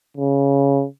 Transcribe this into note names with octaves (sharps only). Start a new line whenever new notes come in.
C#3